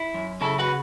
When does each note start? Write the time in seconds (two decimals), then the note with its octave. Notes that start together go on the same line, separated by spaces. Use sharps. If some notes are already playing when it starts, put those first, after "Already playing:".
Already playing: E4
0.14 F#2
0.41 C#3 E4 A4
0.59 F#4 B4